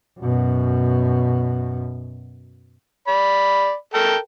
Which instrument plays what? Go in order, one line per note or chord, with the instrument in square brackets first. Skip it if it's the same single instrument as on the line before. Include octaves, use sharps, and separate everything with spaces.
[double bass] F#2 B2
[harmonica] D5 B5
A4 A#4 G5